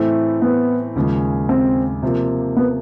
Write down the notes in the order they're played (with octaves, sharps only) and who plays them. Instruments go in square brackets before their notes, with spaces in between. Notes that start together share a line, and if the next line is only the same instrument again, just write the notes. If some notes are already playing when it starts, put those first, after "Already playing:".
Already playing: [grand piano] A2 E3 A3 C4
[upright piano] B3
[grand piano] D#2 C#3 F3 G#3
[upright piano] C4
[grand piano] C3 F3 A#3
[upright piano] B3